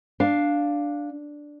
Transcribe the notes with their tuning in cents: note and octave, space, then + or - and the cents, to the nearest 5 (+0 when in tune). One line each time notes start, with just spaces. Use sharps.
D4 +0 F5 +0